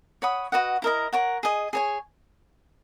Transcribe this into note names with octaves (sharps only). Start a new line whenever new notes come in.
C#5 F#5 B5 D#6
F#4 B4 D#5 F#5
E4 A#4 D#5 A#5
A#4 C#5 F#5
G#4 D#5 G#5
G#4 C#5 G#5